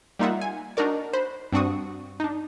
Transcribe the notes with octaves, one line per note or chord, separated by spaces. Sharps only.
G3 A#3 D#4 F4 E5 F#5
G#5
D4 D#4 F#4 A#4 D5
C5 B5 F#6
G2 C4 D4 F#4 C#6 D#6
D4 D#4